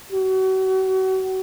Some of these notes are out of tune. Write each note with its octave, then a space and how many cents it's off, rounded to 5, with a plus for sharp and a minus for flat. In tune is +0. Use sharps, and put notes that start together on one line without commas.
F#4 +35